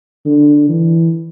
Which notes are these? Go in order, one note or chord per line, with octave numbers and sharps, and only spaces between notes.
D3
E3